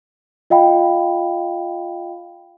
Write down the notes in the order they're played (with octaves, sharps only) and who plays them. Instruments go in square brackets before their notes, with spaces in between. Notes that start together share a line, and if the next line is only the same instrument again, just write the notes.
[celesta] F4 D#5 F5 G5 B5